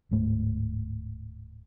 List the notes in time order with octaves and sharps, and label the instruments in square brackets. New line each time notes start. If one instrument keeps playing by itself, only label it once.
[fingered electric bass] D1 G#2 A3